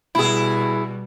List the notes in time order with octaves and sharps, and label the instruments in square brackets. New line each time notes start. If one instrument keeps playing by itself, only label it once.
[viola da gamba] B2 G3 [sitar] E4 G#4